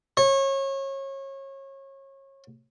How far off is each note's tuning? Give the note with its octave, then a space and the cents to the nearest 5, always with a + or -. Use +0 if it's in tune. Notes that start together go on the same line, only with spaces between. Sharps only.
C#5 -30